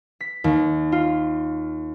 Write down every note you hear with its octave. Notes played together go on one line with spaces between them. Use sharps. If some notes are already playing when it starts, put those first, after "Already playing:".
B6
D#2
F4